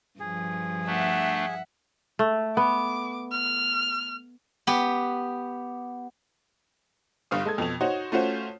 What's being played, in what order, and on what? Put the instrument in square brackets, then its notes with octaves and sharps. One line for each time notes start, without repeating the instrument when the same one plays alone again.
[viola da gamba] G2 F3 [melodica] G#4
[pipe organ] A3 D4 [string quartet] E5 F#5
[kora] A3
[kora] B3 [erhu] D6
[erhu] F6
[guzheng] B3 G4
[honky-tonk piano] G1 G3 F5 D#6
G#3 A4 G#6
F2 B2 A4 F7
D#4 F#4 C5 C#5
A3 C#4 F4 F#4 C5 C#5